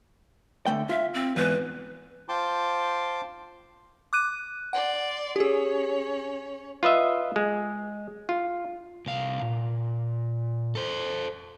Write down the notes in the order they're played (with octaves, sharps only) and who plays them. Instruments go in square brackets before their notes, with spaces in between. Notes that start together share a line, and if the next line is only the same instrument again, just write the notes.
[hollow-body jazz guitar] D3 A3 G5
[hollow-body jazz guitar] F4 [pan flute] E5
[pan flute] C4
[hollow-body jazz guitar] E2 G#2 [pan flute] B4
[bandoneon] F4 C5 G5 A5 C6 D6
[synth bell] D6 F#6 D#7
[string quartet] D5 C6 [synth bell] F#5
[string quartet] C#4 C#5 [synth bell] G4 G#4
[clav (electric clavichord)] F4 B4 D#5 E5
G#3
F4
[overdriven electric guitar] C2 F5
A#2
A4 C5